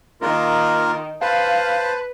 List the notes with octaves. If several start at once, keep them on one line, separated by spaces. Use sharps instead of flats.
D#3 A#3 F4 A#4
B4 C5 F5 A5